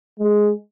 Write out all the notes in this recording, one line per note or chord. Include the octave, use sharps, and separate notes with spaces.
G#3